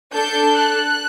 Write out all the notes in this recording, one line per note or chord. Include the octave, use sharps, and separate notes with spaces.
D4 A4 G6
F#6